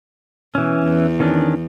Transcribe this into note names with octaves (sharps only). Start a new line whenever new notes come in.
B2 E3 C#4
E2
D#3 C#4 D4